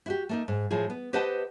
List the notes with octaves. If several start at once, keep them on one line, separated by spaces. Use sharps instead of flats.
E4 F#4 G4
A3 A#3 D#4
G#2
A2 F3 F4 G#4
B3
G4 B4 C5 D#5 F#5 A5